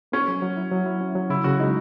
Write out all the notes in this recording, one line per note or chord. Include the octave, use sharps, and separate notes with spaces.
A#3 C#4
F#3
F#3
E4
F#3
E4
C#4
F#3
C#3 E4
C#3 F#4
G#3 D#4